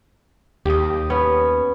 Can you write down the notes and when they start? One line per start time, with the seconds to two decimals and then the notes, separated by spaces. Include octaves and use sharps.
0.65 D#2 G4 D#5
1.10 B3 C#4